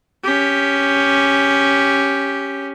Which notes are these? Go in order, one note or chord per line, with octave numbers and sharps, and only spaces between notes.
C#4 G4